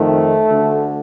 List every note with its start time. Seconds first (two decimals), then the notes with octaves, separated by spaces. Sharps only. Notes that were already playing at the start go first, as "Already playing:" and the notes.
Already playing: F2 D#3 A3
0.48 D2 D3